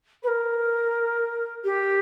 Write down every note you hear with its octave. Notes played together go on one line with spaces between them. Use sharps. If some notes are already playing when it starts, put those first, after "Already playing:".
B4
A#4
G4